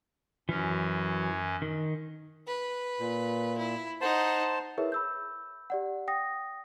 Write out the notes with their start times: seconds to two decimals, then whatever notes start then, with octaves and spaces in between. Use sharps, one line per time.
0.49 F#2 E3 F#3 C#4
1.62 D#3
2.47 B4
3.00 A#2
3.57 E4
4.01 D#4 C5 F#5 A5 C6
4.78 E4 G#4 A#4 B4 C#5 E5
4.92 B5 E6 G6
5.70 G4 D5 F#5
6.08 G5 D#6 A#6